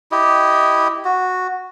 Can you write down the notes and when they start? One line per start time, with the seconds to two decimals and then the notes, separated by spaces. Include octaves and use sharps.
0.12 E4 G4 D#5
1.05 F#4